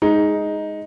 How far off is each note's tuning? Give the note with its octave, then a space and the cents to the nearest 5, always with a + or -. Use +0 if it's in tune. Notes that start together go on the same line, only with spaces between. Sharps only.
G#3 +0 D#4 +5